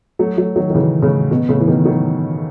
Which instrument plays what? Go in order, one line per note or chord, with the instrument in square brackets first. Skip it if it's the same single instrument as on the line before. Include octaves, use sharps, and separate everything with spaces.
[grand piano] F#3 A3
F#3 A3
D#3 F#3
D#3
C#3 E3
A2 C#3
B2
A2 C#3
E3
B2 D#3
D#3 F#3